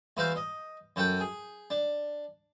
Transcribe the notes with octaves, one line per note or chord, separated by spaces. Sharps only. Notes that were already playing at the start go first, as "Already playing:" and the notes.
E2 E3 E4 F#4 C5 F5
D#5
F#2 F#3 A4 F#5 G5
G#4
D4